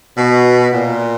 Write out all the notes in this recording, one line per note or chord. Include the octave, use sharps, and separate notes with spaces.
B2
A#2